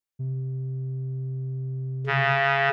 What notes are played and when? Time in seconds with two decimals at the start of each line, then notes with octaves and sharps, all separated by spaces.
0.19 C3
2.07 C#3